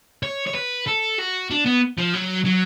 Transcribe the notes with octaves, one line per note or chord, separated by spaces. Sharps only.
C#5
C#5
B4
A4
F#4
D4
B3
F3
F#3
F#3